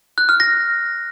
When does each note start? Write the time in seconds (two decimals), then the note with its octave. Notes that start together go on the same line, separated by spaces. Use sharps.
0.18 F#6
0.29 F6
0.40 A#6